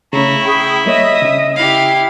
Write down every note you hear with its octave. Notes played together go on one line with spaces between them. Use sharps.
C#3 A3 C#4 E4 A#5 C#6
G#4 G5 B5
G3 A#3 C#5 D#5 E5 D#6
C#3 C#4
E4 G4 F5